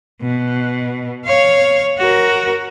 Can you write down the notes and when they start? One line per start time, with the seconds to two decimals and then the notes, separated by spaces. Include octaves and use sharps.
0.22 B2
1.25 C#5 F5
1.99 F#4 A#4